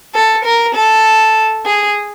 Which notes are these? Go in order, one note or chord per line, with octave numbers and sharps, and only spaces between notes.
A4
A#4
A4
G#4